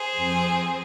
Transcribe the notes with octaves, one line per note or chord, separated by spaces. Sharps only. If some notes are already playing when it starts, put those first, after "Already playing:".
Already playing: G#4 C5
F2 F3 C4